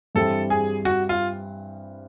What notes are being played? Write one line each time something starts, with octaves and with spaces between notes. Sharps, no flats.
G2 E3 G3 C4 A4
G#4
F#4
F4